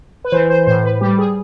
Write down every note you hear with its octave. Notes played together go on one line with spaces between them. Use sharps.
B4
E3 C5
C5
A2 C5
B4
G3 G4
G#4